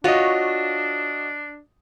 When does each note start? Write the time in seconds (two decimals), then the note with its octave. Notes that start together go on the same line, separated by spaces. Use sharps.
0.04 D4 F4 F#4 C#5 D#5